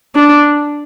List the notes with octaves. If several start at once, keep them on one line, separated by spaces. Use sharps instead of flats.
D4